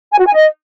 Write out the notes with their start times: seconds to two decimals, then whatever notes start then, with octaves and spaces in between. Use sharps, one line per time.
0.12 G#5
0.19 F#4
0.27 G#5
0.34 D#5